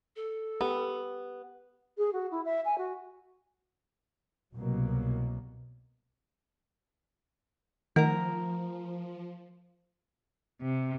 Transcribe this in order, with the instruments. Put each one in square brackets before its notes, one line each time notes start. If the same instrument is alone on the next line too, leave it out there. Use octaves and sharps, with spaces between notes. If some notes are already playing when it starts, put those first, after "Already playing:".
[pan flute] A4
[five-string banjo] B3 [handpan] G4 B4
[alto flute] G#4
F#4
E4
E5
G#5
F#4
[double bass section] C2 B2 F#3 A#3
[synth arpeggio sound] D#3 [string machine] F3 [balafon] A3 [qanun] A#4 A#5
[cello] C3